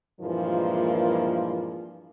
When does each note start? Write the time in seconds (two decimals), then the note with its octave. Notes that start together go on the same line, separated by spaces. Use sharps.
0.21 G2 A#2 E3 F3 G#3 A#3